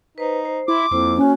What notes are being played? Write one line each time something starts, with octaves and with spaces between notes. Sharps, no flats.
D#4 B4 C5
C5
E4 C6 D6
F2 A#3 E4 C5
A#3 C#4 F#4